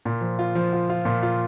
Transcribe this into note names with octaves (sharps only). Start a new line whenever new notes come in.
A#2
F3
F4
F3
F4
F4
A#2
F4